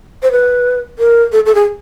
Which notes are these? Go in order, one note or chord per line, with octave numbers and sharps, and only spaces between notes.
C5
B4
A#4
A4
A4
G#4